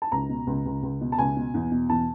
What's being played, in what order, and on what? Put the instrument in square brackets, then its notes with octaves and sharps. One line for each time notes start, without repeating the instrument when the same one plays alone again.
[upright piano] A5
C#2 A#5
B2
C#2
C#2
C#2
B2
A5
C#2 G#5
B2
E2
B2
E2 A5